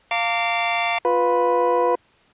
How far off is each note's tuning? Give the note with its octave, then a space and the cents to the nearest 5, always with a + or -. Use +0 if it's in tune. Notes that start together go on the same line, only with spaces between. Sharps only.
F5 +0 A#5 -35 D6 -20
F4 +15 B4 +0